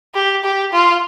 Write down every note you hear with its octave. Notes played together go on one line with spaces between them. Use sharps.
G4
G4
F4